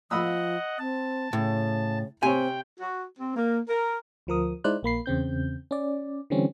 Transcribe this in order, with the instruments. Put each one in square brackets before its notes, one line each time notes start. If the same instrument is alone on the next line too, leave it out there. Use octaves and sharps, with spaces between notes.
[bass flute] F3 [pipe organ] D#5 F#5 [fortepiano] B5 D#6 E6
[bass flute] C4 [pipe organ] A5
[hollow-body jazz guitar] A2 [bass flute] C#3
[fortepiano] C3 C#5 [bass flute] C4 [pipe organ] G5 [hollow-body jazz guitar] G#5
[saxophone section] F#4
C4
A#3
A#4
[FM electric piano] D2 F3 A#4 D#6
G#3 D#4 E4 C5 D5 F#6
A#1 A#3 B5 C7
E2 C#3 C4 G6
C#4 D5
D3 E3 G3 C4 C#4